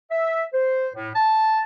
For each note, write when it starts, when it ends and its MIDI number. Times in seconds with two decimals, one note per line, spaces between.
0.11 0.44 76
0.53 0.88 72
0.95 1.10 45
1.15 1.62 81